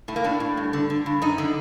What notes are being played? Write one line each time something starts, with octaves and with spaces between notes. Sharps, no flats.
A2 A3
A#3
A2 D4
A2
G2
D3
D3
G2
F#2 D#4
D3